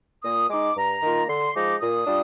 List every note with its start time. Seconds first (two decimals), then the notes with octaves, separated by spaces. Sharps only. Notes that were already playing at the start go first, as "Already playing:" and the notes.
0.24 A#2 D#6
0.50 G#3 D#4 D6
0.76 G2 A#5
1.03 D#3 A#3 F4
1.29 D3 C6
1.55 F3 G#3 D#4 D6
1.81 A#2 D#6
2.07 G3 D4 F4